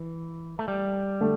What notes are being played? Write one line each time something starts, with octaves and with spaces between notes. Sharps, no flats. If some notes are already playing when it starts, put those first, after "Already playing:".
Already playing: E3
A3
G3
D3 A3